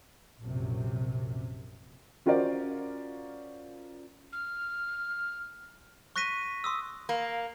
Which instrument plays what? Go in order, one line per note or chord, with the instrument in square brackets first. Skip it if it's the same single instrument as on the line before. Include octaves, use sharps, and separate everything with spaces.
[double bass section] A#1 F#2 C3
[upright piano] C#4 F4 F#4 A#4 C5 D5
[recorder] F6
[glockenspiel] C#6 F#6 A#6 B6 D#7
C6 D#6 E6
[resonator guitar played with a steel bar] A#3